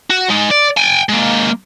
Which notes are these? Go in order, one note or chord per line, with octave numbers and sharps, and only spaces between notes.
F#4
G#3 D#4
D5
G5 G#5
G#3 A#3